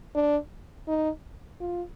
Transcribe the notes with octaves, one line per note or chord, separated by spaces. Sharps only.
D4
D#4
F4